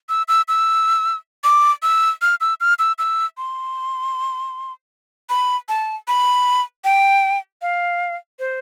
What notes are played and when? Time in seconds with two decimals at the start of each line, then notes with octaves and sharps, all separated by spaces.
0.09 E6
0.28 E6
0.48 E6
1.44 D6
1.83 E6
2.22 F6
2.41 E6
2.61 F6
2.79 E6
2.99 E6
3.37 C6
5.30 B5
5.69 A5
6.08 B5
6.84 G5
7.62 F5
8.39 C5